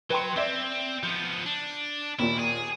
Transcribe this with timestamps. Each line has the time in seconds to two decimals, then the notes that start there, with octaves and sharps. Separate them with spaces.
0.10 F#3 B4 G5 C6
0.36 C4 D5 E5 G#6
1.03 F3 B3 G6 C#7
1.45 D4
2.19 D#2 A#2 E4
2.39 G#4